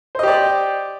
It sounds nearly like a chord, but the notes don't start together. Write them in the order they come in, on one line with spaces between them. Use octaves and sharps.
C5 D#5 G4 D5